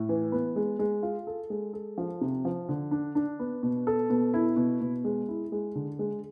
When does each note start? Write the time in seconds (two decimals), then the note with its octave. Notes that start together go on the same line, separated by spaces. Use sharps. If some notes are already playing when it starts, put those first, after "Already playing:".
Already playing: A2
0.09 E3
0.32 B3
0.56 G#3
0.79 G#3
1.03 F4
1.27 A4
1.50 G#3
1.73 A4
1.98 F3
2.21 C3
2.45 F3
2.69 D3
2.91 D4
3.15 D4
3.39 B3
3.63 B2
3.87 A4
4.10 B2
4.34 E4
4.57 B2
4.81 B2
5.04 G#3
5.28 E4
5.52 G#3
5.75 D3
5.99 G#3